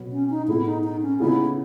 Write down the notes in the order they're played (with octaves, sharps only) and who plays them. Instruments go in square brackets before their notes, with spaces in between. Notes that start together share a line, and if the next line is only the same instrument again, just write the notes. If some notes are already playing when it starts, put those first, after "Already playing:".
Already playing: [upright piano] B2 F#3 B3 F#4
[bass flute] C#4
D#4
[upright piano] A2 G#3 B3 [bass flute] E4
[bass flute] D#4
D#4
C#4
[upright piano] C#3 G#3 B3 D#4 [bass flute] E4